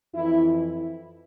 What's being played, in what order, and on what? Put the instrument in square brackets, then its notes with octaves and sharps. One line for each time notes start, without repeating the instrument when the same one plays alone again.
[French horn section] F2 E3 E4